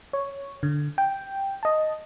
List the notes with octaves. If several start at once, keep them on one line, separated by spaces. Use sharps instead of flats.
C#5
D3
G5
D#5 A5